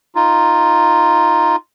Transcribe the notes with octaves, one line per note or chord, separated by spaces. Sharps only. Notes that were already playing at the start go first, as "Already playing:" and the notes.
D#4 F4